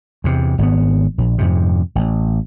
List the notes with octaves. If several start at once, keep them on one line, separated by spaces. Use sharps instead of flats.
E2 C3
G#1 G#2 B3
A#1
F2 G#2 C3
A1